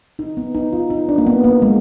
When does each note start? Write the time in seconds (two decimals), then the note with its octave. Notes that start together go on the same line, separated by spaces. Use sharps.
0.19 D#4
0.37 B3
0.55 D#4
0.73 F4
0.90 D#4
1.09 D4
1.18 A#3
1.27 B3
1.44 A#3
1.62 G#3